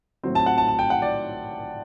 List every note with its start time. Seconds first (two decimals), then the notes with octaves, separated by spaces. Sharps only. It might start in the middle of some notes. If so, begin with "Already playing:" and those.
0.23 A2 F#3 C4
0.35 A5
0.46 F#5
0.58 A5
0.68 A5
0.79 G5
0.90 F#5
1.02 D5